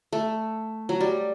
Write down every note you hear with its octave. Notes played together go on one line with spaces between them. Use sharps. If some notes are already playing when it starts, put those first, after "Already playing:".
A3
F#3
G3